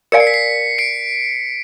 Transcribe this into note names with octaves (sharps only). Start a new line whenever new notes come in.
A#4 D5 F5 G#5 C#7
C7
B6
C7
C7 D7